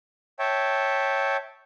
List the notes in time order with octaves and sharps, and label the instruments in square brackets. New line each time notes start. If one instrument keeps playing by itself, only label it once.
[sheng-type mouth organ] C#5 E5 G5 A5